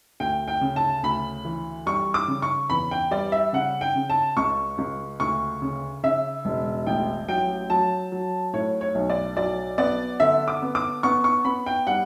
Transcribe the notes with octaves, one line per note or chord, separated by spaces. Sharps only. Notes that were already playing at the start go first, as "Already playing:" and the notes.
D2 G5
G5
C#3
A5
D2 B5
E3
G3 C#6
D6
C#3
C#6
E2 B5
G5
G3 D5
E5
C#3 F#5
G5
C#3
A5
C#2 C#6
C#2
D2 C#6
C#3
C#3 E5
E1
A1 G5
F#3 G5
F#3 A5
F#3
A2 C#5
C#5
B1
D5
F#3 D5
B3 D5
D3 E5
D6
B3
D6
B3 C#6
C#6
B3 B5
G5
G3 F#5